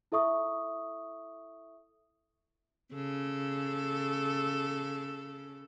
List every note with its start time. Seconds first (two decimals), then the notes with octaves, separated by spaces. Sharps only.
0.12 E4 A4 E5 C#6 D#6
2.94 C#3 A4